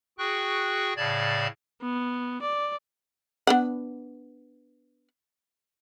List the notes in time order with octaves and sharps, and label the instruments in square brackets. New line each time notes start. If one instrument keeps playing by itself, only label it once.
[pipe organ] F#4 G#4 G5 C#6 F#6
A2 C#3 D5 A5 G#6
[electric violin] B3
D5
[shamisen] B3 D4 F#5